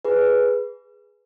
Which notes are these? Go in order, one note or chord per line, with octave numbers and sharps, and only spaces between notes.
G#4 B4